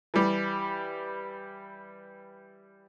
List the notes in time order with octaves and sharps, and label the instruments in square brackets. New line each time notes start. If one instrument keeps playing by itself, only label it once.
[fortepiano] E3 G3